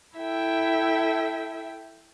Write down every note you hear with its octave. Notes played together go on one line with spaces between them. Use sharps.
E4 A4 E5 G5